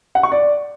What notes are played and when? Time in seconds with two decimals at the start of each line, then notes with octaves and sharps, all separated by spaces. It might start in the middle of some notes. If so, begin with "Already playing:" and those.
0.15 F#5
0.23 C#6
0.32 D5